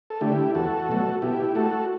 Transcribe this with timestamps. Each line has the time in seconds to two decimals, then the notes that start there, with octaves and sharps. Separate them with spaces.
0.10 A4
0.21 D3 A3 E4 G4
0.55 E2 F#4 A4
0.89 B2 F#3 A3
1.22 B2 E4 G4
1.55 A3 F#4 A4